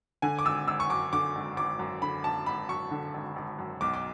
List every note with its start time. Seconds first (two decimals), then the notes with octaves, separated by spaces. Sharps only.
0.22 D3 G#5
0.39 D6
0.45 G#1 E6
0.68 G#1 E6
0.80 C#6
0.90 F#2 D6
1.13 D3 D6
1.35 G#1
1.57 G#1 D6
1.79 F#2
2.02 D3 B5
2.24 G#1 A5
2.46 G#1 B5
2.69 F#2 C#6
2.91 D3
3.14 G#1
3.36 G#1
3.59 F#2
3.81 B1 D6
3.94 D6